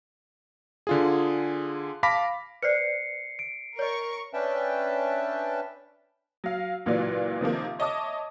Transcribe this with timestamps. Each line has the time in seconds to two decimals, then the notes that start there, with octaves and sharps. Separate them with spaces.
0.87 D3 F4 G#4
2.03 F5 A5 B5 D6 A#6 B6
2.62 B4 C5 D5 C7 C#7
3.39 D7
3.79 A#4 C#5 D#5 C#6
4.34 C#4 D4 B4 E5 G5 A5
6.44 F#3 F5
6.86 C#2 A#2 E3 F#3 F4 D5
7.41 C3 D#3 F3 A#3
7.79 C#5 D#5 E5 A5 D6 D#6